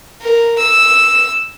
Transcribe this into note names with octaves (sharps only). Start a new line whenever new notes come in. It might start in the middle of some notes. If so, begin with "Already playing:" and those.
A#4
E6